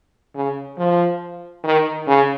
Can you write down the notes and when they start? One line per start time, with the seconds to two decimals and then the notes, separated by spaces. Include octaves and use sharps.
0.35 C#3
0.78 F3
1.64 D#3
2.07 C#3